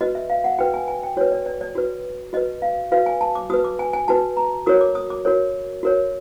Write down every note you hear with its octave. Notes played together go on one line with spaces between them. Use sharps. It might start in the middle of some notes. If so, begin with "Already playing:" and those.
F#4 B4 D#5
E5
F5
F#5
F#4 B4 G5
G#5
G#5
G5
F#4 B4 C#5
D5
D5
D5
F#4 B4
F#4 B4 D#5
F5
F#4 B4 F5
G#5
A5
D6
F#4 B4 D#6
D6
G#5
G#5
F#4 B4 A5
A#5
F#4 A#4 C#5 D#6
D6
D#6
D6
F#4 A#4 C#5
F#4 A#4 C#5